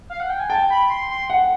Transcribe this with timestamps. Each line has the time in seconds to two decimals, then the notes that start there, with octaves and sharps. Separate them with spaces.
0.10 F5
0.20 F#5
0.30 G5
0.40 G#5
0.50 G5 A5
0.70 B5
0.90 C6
1.10 C6
1.30 F#5